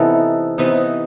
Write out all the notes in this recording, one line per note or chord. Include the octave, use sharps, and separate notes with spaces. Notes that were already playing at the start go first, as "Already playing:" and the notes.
Already playing: C3 E3 B3 D#4 A4
C3 E3 B3 D#4